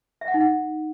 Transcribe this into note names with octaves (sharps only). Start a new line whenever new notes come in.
E5
F#5
D#4
F#5